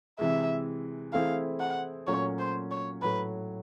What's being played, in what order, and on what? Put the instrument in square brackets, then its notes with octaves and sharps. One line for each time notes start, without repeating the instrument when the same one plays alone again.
[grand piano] C3 E3 G#3 [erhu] E5
[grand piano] E3 A3 C4 E4 G#4 [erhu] F5
[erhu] F#5
[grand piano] A#2 F#3 A3 C#4 F#4 [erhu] C#5
[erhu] C5
C#5
[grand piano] A2 F#3 A3 [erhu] B4